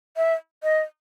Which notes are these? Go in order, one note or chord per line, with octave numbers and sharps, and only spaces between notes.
E5
D#5